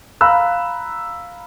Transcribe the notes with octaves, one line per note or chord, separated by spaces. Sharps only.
F5 A#5 B5 E6 F#6